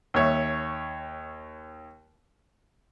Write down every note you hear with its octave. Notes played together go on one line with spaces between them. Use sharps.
D#2 C#5 E5